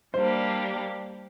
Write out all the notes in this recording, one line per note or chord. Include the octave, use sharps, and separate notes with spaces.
G3 A#3 D4 G4 C5